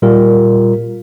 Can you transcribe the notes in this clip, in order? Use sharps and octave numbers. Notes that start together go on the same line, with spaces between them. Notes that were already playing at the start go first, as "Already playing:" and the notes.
A#2 G3 F4 A#4